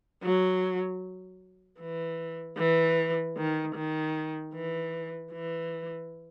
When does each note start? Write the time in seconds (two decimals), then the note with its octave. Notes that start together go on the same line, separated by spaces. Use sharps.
0.23 F#3
1.80 E3
2.58 E3
3.37 D#3
3.75 D#3
4.54 E3
5.32 E3